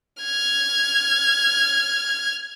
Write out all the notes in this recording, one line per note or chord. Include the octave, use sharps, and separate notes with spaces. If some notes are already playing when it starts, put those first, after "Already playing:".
F6 G#6